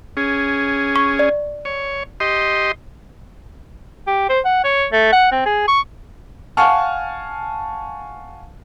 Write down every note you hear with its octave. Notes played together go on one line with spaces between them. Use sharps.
C#4 G#4
C#6
D5
C#5
G4 D#5 C6
G4
C5
F#5
C#5
A3
F#5
C4
G#4
C#6
F5 F#5 G#5 A5 C#6 F6